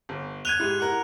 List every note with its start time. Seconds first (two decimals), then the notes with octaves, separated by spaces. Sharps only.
0.09 G1
0.45 F#6 G#6 D#7 F7 G7
0.60 G#2 E4 G4
0.79 A#4 F#5